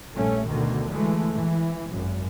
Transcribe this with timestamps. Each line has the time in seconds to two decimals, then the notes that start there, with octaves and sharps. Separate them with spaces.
0.13 A#1 G2 A3 C#4
0.46 D2 B2 D3 D#3
0.92 E3 G#3 A3
1.33 E3
1.90 G#1 F#2